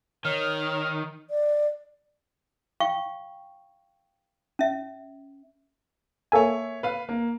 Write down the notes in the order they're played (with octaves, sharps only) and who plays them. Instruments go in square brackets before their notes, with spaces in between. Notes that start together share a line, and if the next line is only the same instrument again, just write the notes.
[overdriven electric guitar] D#3 [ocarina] C#5 [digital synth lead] F6
[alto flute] D5
[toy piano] F5 G5 C#6
C#4 E5
[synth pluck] A#3 A4 G#5 [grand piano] C#5 E5
[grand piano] B4 F5
A#3